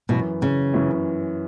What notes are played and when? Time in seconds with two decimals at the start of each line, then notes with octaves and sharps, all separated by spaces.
0.09 F#2 B2 E3 C#4 E4
0.42 C#3
0.73 F#2 E3 C#4 E4